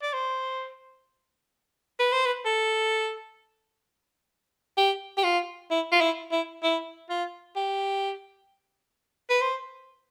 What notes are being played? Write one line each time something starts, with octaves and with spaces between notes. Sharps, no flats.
D5
C5
B4
C5
B4
A4
G4
G4
F4
E4
F4
E4
E4
E4
F4
G4
B4
C5